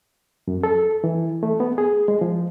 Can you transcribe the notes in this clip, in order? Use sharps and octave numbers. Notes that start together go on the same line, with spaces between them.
F#2
A4
E3
A3
B3
G#4
G#3
F3